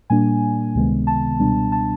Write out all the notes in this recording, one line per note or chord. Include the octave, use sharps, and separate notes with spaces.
A#2 G3 A#3 D4 G#5
C#2 C3 D#3 G#3 B3
A5
C#2 B2 G3 B3 D4
A5